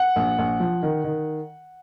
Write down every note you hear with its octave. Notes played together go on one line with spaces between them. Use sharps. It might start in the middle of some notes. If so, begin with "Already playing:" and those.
Already playing: F#5
A#1
A#1
F3
D#3
D#3